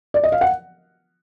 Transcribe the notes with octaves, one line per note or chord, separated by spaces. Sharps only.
D5
D#5
F5
F#5